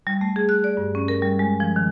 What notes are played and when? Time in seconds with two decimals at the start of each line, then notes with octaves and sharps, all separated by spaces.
0.07 G3
0.21 A3
0.36 G#4
0.49 F#6
0.64 D5
0.77 G2
0.95 C#4
1.08 A#4
1.22 G3
1.39 G#3
1.60 F3
1.76 D#3